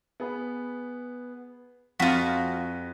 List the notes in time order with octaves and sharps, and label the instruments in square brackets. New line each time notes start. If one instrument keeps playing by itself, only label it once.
[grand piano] B3 G#4 B5
[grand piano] F2 [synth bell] F3 C4 [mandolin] F4 F#4 [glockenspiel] F#6 A#6 B6